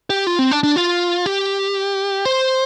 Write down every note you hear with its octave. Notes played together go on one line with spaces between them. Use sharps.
G4
F4
C4
D4
D4
F4
G4
C5